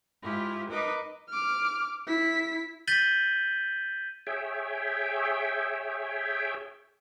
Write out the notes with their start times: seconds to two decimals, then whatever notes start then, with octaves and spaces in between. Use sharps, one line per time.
0.22 G#2 E4 F4 G4
0.70 D#4 A#4 B4 D#5 D6
1.29 D6 F6
2.07 E4 B6
2.87 G6 A6 B6 D#7 F#7 G7
4.27 G#4 C#5 E5 G5